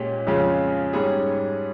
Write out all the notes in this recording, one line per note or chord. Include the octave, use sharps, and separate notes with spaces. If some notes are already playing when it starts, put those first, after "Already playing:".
Already playing: A#2 G#3 C#4 G4
F2 C#3 G#3 C#4 F4
G#2 G3 C#4 G#4